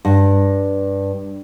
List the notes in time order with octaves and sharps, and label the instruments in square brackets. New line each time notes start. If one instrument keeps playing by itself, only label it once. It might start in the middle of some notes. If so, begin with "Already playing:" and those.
[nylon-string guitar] G2